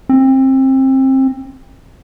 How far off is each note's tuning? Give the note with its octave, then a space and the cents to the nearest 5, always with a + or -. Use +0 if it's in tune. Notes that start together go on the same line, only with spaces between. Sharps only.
C4 +25